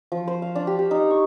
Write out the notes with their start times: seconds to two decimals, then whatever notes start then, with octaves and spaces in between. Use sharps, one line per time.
0.12 F3
0.27 C5
0.42 F5
0.55 D4
0.67 G4
0.79 G4
0.91 D#4
1.10 C#6